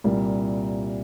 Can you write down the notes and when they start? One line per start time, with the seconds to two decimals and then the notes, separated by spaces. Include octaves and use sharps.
0.04 C2 A#2 G3 A#3 E4